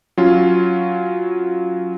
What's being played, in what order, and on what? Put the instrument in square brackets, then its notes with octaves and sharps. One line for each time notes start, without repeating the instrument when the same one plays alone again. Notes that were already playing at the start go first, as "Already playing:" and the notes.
[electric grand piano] F#3 C#4 F4